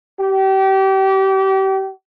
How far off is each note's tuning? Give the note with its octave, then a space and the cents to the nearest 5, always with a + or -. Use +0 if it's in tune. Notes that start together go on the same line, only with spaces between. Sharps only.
G4 -30